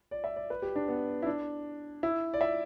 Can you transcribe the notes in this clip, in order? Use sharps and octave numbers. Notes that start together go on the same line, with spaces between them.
D5
E5
D5
B4
G4
D4
B3
E4
D4
E4
D5
E5